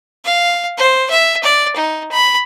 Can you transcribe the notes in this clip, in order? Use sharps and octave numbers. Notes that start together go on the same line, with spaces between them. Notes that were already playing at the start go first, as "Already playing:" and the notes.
F5
C5
E5
D5
D#4
B5